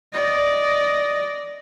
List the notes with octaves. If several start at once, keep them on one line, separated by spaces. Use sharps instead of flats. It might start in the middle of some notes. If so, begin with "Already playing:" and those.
D5 D#5